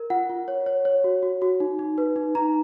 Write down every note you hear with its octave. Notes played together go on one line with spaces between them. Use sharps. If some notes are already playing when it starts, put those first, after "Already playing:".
Already playing: A#4
F4 F#5
F4
C#5
C#5
C#5
F#4
F#4
F#4
D#4
D#4
B4
D#4
D#4 A#5